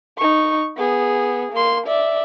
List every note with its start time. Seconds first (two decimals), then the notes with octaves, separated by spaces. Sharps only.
0.17 D#4 C#6
0.77 B3 G#4
1.52 A#3 C6
1.86 D5 E5